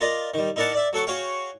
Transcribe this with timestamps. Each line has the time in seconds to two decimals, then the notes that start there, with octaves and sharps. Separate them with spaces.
0.01 F4 A#4 D5 D#5
0.34 D#3 G3
0.56 D#4 E4 A#4 D5 F#5 A5
0.73 D5 E5
0.93 F#3 A4 F#5 C#6
1.07 F#4 G#4 C#5 F5 G5